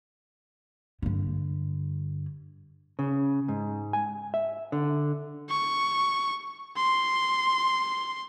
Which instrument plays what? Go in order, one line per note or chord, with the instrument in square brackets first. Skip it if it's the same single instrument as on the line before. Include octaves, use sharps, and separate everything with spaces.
[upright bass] G2 D3
[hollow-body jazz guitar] C#3
G#2
G#5
E5
D3
[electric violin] C#6
C6